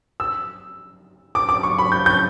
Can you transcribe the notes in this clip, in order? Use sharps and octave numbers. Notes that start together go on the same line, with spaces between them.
E6
D6
D6
C#6
B5
G6
G6